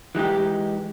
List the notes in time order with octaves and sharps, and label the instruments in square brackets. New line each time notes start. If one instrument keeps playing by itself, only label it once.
[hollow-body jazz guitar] E3 G#3 D#4 G4